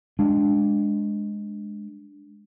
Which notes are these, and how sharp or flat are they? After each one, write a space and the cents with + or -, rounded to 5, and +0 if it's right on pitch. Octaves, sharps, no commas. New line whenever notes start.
G#3 +0 D4 +0